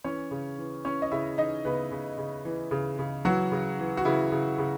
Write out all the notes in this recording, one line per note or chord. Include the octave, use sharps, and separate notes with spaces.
E3 C#4 C#5
C#3
E3
E3 C#4 C#5
D#5
C#3 E4 E5
E3 D#4 D#5
C#3 B3 B4
C#3
C#3
E3
C#3
C#3
E3 F#3 F#4
C#3
E3
F#4
C#3 E3 E4
C#3
C#3